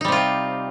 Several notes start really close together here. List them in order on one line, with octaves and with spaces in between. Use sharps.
D#4 G3 C3 F4 C4